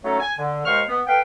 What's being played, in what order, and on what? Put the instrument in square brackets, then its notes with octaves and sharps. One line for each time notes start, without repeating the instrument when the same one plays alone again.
[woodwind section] F#3 A3 C#4 D#4 A4 C#5
G#5
D3
D#2 G#3 C5 F5 C#6 F6
B3
A4 B4 F5 G5